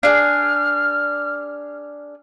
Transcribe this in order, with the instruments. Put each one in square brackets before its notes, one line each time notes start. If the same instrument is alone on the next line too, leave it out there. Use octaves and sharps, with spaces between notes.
[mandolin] D4 G#4 [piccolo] F6